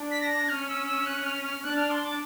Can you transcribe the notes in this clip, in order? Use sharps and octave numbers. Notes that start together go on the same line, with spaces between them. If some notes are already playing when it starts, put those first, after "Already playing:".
Already playing: D4
B6
A#6
C#4 F6
E6
E6
F#6
F6
F6
D4 F#6
F6
C6
D6